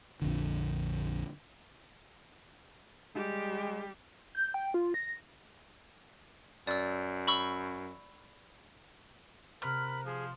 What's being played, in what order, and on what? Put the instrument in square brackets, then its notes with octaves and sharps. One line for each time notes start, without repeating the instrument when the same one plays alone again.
[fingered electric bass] A#1 F2 D3
[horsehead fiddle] G3 G4 [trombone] G#3
[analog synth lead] G6
G5
F4
A#6
[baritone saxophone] F#2 [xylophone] D5 E6
[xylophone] B5 C#6 E6
[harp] C3 C4 F#6 [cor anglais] A#4 [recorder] B5 [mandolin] F6
[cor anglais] F3 [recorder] G#4